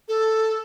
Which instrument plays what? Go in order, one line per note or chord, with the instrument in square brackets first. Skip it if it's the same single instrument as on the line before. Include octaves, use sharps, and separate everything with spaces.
[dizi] A4